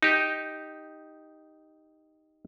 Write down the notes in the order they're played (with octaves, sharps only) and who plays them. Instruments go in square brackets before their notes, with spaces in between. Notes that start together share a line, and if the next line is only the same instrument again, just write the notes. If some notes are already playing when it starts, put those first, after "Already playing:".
[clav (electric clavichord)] D#4 G4